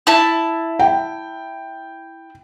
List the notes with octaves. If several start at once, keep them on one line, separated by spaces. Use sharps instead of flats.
E4 A5
G5